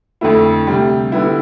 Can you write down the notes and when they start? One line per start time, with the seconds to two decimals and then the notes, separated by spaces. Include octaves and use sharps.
0.21 F2 D3 A3 E4
0.67 D2 C3 G3
1.12 D3 G3 B3 E4